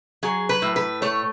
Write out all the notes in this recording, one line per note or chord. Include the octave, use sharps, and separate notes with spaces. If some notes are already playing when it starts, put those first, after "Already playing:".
F#3 G#4
B4
A2
B4
A3 C#5